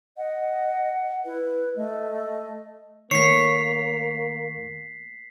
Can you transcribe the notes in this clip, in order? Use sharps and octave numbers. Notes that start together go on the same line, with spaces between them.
D#5 F#5
E4 B4
A3 D#5
D#3 A3 A#3 C#5 B6 C7